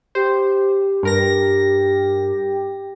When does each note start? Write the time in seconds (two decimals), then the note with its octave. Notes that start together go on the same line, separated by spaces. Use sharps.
0.15 G4 C5
1.03 G2 A#4 A#6